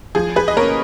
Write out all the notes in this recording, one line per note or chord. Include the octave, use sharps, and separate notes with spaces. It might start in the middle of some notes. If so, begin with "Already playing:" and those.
F3 G#4
G#4 B4
D#5
A#3 C#4 A#4 C#5